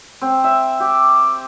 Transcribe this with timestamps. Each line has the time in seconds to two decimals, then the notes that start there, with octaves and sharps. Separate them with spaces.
0.21 C4
0.44 E5
0.80 G4